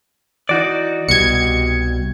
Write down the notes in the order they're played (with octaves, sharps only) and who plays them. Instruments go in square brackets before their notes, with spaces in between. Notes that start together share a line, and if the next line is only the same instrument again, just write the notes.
[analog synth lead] E3 [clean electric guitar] D#4 F#4 D5
[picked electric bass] C2 B2 [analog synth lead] G3 [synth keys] G#6 C#7